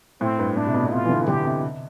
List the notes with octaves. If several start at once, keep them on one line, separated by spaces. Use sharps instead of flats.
A2 C4
G2
A2 D4
C3
B2
B2
C3 F4
E3
D3
D3 G4
C3
C3